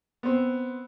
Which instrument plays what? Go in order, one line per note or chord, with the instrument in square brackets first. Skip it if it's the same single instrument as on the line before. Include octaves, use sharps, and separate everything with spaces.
[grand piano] B3 C4